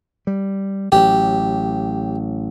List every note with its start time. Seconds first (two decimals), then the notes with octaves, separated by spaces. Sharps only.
0.27 G3
0.92 A1 F#3 G4